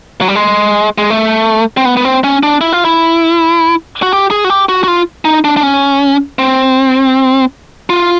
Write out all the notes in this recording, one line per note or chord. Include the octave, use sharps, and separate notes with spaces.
F#3
G3
G#3
G#3
A3
C4
B3
B3
C4
C#4
D4
E4
F4
E4
F#4
G4
G#4
F#4
G4
F#4
F#4
F4
D#4
D4
D4
C#4
C4
F4